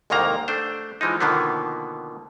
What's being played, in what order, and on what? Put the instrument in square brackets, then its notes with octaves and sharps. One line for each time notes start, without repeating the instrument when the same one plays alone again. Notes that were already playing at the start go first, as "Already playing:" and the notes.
[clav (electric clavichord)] C2 F2 G#2 D#3 A#3 A#5
A3 D4 C5
E3 F3 G#3 D#4
B2 D3 D#3 F3 A#3 B3